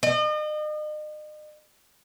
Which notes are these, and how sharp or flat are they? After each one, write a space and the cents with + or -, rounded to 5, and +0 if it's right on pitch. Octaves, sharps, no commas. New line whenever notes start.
D#5 -40